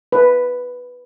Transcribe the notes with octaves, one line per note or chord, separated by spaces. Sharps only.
B4